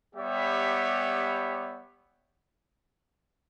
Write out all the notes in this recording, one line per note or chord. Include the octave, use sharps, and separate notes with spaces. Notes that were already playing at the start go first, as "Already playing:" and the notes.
G3 B3 G4 C#5 E5